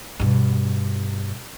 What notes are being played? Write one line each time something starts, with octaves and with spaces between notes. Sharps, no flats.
G2 B2